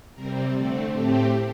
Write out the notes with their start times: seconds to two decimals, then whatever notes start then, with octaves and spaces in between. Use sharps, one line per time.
0.14 C3 G3 C4 A#4
0.53 D3 A3 C4 A4
0.91 A2 A3 C4 G4